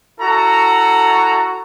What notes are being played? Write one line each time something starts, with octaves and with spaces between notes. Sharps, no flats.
E4 F#4 A4 A#5